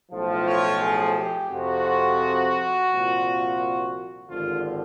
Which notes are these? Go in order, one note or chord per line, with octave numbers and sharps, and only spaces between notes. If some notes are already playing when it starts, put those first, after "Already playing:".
B1 A2 F3
C#5
G#4
G4
F2 C3 F3 F#4
C2 A#2 F3
G#1 G2 D3 F3 F4